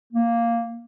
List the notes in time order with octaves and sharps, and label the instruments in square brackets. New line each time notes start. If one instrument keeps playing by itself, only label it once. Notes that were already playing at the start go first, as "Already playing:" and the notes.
[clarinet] A#3